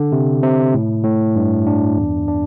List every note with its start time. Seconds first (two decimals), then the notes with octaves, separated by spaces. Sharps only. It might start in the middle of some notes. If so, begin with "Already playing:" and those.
Already playing: D3
0.12 C3
0.43 C3
0.74 A2
1.04 A2
1.36 G2
1.67 D4
1.97 E2
2.28 D4